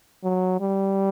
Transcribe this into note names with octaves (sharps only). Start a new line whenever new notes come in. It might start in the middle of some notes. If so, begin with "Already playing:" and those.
F#3
G3